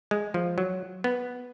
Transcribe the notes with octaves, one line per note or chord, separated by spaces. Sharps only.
G#3
F3
F#3
B3